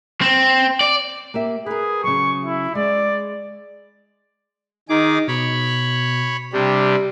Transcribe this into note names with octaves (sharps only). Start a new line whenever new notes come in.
C4
D5
A#3 G4 E5
G#4 A#4 B4
C#3 F#3 C#6
E4
G#3 D5
D#3 D#4 G#4 D6
B2 C#5 B5
C3 G3 D4 G4